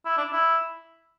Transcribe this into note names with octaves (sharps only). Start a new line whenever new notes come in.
E4
D4
E4